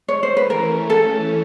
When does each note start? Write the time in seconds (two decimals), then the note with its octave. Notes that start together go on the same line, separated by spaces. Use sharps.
0.08 C#5
0.23 C5
0.37 B4
0.50 E3 A3 C#4 A#4
0.90 A4